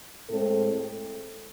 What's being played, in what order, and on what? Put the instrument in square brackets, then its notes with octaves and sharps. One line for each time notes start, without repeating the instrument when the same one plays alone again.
[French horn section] A2 G#3 C4 A4